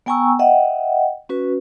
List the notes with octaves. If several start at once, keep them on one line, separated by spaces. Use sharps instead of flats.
B3 G5 G#5 A#5 C#6 E6
D#5 E5 F#5 G5
C#4 F#4 B4